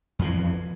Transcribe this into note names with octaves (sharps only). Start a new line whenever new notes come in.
F2 E3 F3